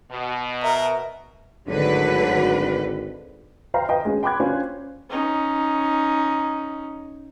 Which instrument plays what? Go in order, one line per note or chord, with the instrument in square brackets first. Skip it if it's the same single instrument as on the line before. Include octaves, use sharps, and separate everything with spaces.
[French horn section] B2
[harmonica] A#4 [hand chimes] E5
[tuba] G#1 [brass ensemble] A2 F#3 [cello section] D3 B4
[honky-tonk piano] B4 C5 F5 G5 A#5
B4 D#5 G5
G#3 C#4
G5 B5 C6 D6 F#6 G#6
C#4 D4 F4 C5
[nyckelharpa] C#4 D#4